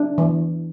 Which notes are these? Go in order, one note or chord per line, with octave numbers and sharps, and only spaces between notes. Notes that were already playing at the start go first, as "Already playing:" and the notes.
Already playing: D4
E3